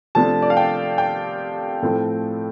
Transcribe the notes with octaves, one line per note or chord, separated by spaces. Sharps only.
C3 F3 A3 D4 A5
D5
F5
G5
G5
A2 F3 A3 C4